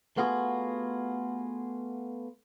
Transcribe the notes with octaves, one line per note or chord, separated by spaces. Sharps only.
A3 B3 F4 F#4 G#4